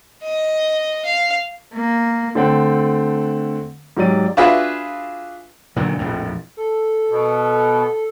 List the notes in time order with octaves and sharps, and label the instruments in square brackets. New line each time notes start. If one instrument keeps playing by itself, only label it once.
[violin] D#5
F5
[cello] A#3
[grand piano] D3 A3 C4 F#5 G5
G#2 F#3 G4 D5 D#7
[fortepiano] D4 F4 F#4 G#4 B4 E5
[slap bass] A#2 D3 D#3 F#3
A#1 F2 A2
[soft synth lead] A4
[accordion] B2